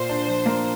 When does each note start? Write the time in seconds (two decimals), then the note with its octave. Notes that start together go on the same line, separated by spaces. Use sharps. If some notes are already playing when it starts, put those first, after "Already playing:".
Already playing: A#2 C5
0.09 D4
0.28 F3
0.46 A#3